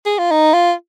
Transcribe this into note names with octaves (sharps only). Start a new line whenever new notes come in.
G#4
F4
D#4
F4